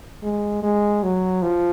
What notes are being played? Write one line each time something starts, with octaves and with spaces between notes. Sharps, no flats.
G#3
G#3
F#3
F3